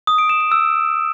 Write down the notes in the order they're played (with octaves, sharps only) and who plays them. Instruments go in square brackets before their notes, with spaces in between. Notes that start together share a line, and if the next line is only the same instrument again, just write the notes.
[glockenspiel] D#6
D7
E7
E7
E6